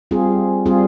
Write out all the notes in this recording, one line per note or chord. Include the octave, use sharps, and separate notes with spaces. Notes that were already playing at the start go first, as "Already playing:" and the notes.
G3 C4 F4 G#4
G3 C4 F4 G#4